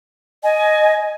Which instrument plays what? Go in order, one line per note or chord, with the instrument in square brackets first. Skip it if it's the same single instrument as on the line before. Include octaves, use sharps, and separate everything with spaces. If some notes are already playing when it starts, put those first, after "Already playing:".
[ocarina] D#5 [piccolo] G#5